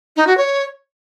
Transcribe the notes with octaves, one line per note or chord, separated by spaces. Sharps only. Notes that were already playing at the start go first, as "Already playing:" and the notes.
D#4
F#4
C#5